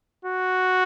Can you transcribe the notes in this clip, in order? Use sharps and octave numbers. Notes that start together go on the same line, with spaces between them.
F#4